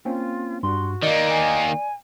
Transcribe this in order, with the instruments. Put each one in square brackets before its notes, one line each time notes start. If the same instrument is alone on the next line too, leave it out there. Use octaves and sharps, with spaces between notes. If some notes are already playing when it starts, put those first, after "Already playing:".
[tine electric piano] A#3 C4 C#4 [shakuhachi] F4
[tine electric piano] G2 [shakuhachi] F#4 [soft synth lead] C6
[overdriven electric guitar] D#3 A#3 [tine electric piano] D5 [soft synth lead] D#5
[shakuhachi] G#5